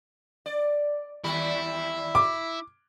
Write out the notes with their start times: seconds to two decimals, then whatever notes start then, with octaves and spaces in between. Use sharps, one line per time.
0.46 D5
1.24 D#2 G3 E4
2.15 D6